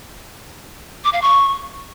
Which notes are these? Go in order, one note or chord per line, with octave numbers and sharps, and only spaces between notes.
D6
F5
C#6